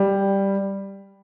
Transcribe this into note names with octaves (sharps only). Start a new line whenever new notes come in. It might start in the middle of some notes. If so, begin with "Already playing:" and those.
Already playing: G3